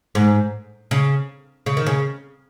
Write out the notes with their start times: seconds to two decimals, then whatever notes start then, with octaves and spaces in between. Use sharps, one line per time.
0.15 G#2
0.91 C#3
1.66 C#3
1.77 D#3
1.87 C#3